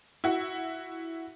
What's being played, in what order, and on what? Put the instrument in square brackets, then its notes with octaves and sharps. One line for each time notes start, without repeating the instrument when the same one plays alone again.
[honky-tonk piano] E4 F#4